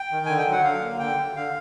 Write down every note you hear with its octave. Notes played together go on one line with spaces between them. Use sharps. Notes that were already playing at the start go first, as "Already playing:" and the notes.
Already playing: G5
D#3
D3 G#5
G5
F#3
F#5
D3 F5
A#3
D3 G5
D3
D3 F5